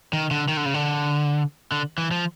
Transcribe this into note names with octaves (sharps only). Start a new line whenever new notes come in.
D#3
D3
D#3
D3
C#3
D3
D3
E3
F3